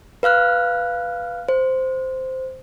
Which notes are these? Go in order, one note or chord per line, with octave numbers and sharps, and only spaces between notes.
B4 F5 F6 F#6
C5